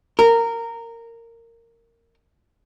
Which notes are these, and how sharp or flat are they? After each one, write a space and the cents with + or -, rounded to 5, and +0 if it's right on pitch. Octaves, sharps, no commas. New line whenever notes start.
A#4 -15